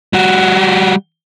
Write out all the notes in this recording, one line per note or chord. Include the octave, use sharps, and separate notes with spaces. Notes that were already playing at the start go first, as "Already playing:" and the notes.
G3 F#4